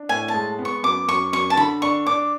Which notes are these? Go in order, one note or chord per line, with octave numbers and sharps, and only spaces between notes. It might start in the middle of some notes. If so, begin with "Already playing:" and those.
Already playing: D4
A2 G#5
A5
G#3
B3
C#6
F#2 D6
F#2 C#6
F#2 C#6
A5
D3 B5
D4 C#6
D4 D6